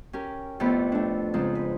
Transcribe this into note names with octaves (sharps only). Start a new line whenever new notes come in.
C#4 G4 A#4
F2 A2 B3 G4 D5 B5
A3 D4
G#2 C#3 F3 G#3 C4
B4